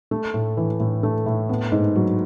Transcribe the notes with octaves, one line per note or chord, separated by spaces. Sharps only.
A3
A2
E3
A2
A3
A2
B3
G#2
F#3